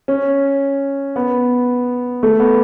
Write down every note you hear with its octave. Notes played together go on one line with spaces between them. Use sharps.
C#4
B3
A3
B3